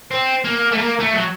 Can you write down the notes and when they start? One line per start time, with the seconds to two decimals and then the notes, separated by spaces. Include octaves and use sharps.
0.11 C4
0.44 A#3
0.72 A3
0.78 A#3
1.00 A3
1.13 F#3